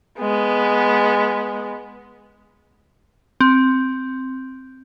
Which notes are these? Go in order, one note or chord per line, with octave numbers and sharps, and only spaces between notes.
G#3 B3
C4